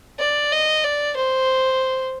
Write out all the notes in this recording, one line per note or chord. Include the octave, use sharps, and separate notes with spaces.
D5
D#5
D5
C5